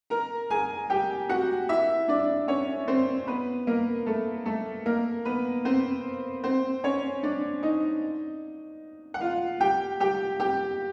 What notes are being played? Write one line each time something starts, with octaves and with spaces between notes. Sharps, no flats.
A#4 A#5
G#4 G#5
G4 G5
F#4 F#5
E4 E5
D4 D5
C#4 C#5
C4 C5
B3 B4
A#3 A#4
A3 A4
A3 A4
A#3 A#4
B3 B4
C4 C5
C4 C5
C#4 C#5
D4 D5
D#4 D#5
F#5
F4 F5
G4 G5
G4 G5
G4 G5